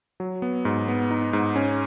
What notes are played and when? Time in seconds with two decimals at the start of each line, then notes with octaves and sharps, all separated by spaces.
0.20 F#3
0.42 B3
0.65 G#2
0.88 B3
1.11 D#4
1.33 G#2
1.56 C#4